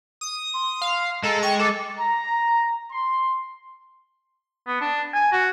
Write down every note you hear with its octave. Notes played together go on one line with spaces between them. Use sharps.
D#6
C6
F5
G#3 A4 A#5
G5 C#6
A4 D6
A#5
C6
B3
D4
G#5
F#4